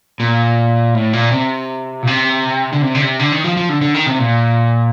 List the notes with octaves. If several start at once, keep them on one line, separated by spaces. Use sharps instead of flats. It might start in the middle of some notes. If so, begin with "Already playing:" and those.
A#2
A2
A#2
C3
A#2
C3
D3
C3
D3
C3
D3
D#3
F3
F3
D3
D3
D#3
C3
A#2